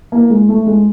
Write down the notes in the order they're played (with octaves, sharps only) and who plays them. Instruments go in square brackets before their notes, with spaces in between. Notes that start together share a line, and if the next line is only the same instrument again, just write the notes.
[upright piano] A#3
G#3
A3
G#3